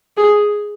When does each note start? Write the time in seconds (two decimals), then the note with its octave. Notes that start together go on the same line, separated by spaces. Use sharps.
0.17 G#4